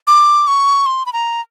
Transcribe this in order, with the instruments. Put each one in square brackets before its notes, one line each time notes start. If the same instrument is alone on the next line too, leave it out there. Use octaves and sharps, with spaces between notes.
[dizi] D6
C#6
C6
B5
A#5